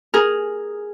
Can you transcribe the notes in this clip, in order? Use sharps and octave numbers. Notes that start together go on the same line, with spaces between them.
G#4 A#4